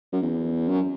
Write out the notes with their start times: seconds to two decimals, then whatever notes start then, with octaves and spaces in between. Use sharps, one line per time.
0.13 F#2
0.22 E2
0.69 F#2